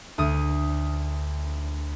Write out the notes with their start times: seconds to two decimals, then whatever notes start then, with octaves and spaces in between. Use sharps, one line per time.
0.18 D2 D#6